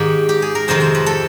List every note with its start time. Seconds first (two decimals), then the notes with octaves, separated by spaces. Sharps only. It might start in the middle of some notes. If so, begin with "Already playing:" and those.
Already playing: G#2 D#3 G4
0.29 G4
0.42 G#4
0.55 A#4
0.68 F2 C3 D#3 C5
0.81 C5
0.95 B4
1.06 A4